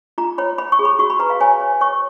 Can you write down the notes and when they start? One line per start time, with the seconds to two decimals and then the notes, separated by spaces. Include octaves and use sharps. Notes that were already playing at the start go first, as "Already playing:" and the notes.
0.18 F4 A#5
0.38 C#5 B5
0.58 C#5 B5
0.72 C#6
0.79 G#4
0.85 B5
0.99 F#4 C#6
1.10 B5
1.19 B4 A#5
1.30 F5
1.40 C#5 G#5
1.60 C#5
1.81 C#5 C#6